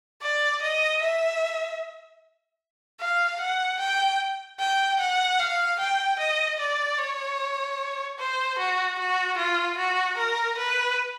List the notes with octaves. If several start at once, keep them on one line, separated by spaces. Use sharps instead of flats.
D5
D#5
E5
F5
F#5
G5
G5
F#5
F5
G5
D#5
D5
C#5
C5
F#4
F#4
F4
F#4
A#4
B4